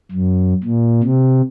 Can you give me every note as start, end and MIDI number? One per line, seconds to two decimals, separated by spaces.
0.12 0.54 42
0.64 1.01 46
1.03 1.42 48